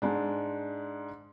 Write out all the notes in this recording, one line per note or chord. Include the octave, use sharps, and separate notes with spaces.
G#2 G#3 D4